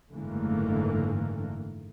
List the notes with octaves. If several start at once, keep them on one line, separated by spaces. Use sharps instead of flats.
F#1 G#2 D3 E3 A3 A#3